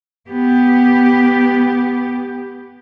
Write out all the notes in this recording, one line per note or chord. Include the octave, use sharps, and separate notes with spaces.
B3 G4